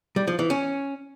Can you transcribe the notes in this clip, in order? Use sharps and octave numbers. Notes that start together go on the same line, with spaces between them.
G3
F3
E3
C#4